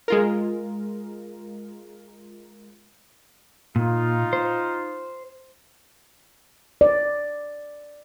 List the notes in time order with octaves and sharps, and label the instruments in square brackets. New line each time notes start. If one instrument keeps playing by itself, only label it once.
[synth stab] G#3 F4 A#4
[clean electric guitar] A#2 [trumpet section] D#4 F4
[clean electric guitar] C5
[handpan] D5